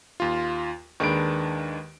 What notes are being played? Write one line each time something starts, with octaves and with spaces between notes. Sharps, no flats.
D#2 F4
D#2 D#3 G#3 D4 B4 D7